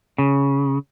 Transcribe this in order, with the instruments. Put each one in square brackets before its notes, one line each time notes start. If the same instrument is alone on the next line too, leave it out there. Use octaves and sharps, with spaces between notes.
[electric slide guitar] C#3